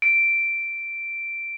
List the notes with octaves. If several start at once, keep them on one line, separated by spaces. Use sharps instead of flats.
D7